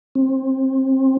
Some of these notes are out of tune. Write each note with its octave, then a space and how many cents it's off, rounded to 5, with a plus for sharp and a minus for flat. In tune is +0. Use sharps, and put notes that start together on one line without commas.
C4 +25